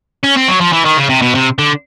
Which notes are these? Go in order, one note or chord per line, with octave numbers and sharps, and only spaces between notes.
C#4
C4
F#3
F3
E3
D#3
C#3
C3
B2
C3
D3